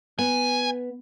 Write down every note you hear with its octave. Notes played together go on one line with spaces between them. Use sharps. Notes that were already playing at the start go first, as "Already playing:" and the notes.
B3 G#5